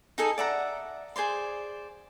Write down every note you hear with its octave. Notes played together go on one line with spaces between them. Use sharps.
D#4 G#4 A4 G#5
D5 E5 F#5 A#5
G#4 C5 D5 C6